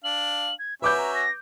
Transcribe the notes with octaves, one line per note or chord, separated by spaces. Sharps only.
D4 F5 F#7
G#6
C#4 F#4 B4 E5 B5 D6 G6
A#5
A#6